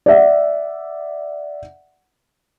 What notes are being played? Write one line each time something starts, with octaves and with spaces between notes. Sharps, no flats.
D5 E5 F#5